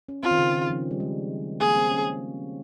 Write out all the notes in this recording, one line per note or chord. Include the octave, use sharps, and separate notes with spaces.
C#4
C4 F4
D#3
C#3
D#3
F3
G3
G#3
A#3 G#4
C4
C#4